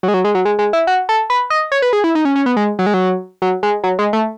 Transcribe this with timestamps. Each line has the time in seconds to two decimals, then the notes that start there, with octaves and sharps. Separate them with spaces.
0.03 F#3
0.08 G#3
0.14 F#3
0.24 G#3
0.35 F#3
0.45 G#3
0.59 G#3
0.73 E4
0.87 F#4
1.09 A4
1.30 B4
1.50 D#5
1.72 C#5
1.82 B4
1.93 G#4
2.04 E4
2.15 D#4
2.25 C#4
2.35 C#4
2.46 B3
2.57 G#3
2.79 F#3
2.86 G#3
2.94 F#3
3.42 F#3
3.63 G#3
3.84 F#3
3.99 G#3
4.13 A3